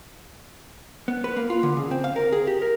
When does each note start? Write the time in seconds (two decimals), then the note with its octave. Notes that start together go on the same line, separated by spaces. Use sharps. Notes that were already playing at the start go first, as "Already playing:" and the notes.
1.08 B3
1.24 B4
1.37 A#3
1.50 F4
1.63 D3
1.77 C#3
1.91 C4
2.04 F5
2.16 A#4
2.32 G#4
2.47 G4
2.62 A#4